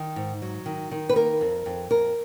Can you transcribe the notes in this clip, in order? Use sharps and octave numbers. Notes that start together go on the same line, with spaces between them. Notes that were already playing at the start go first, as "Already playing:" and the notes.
Already playing: D#3
G#2
F#3
D#3
D#3
B4
A#3 A#4
F2
F2
F2 A#4